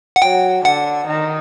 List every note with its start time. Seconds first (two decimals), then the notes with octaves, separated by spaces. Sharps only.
0.16 F#5
0.22 F#3 G5
0.65 D3 F#5
1.07 D#3